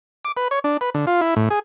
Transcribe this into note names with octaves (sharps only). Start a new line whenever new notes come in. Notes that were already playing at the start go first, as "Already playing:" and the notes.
D6
B4
C#5
D4
B4
D3
F4
E4
A2
G#4